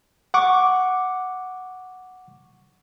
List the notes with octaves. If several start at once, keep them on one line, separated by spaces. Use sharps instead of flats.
F#5 C#6 D6